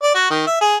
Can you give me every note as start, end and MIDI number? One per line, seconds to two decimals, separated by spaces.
0.02 0.13 74
0.15 0.27 66
0.30 0.44 51
0.47 0.57 76
0.61 0.76 68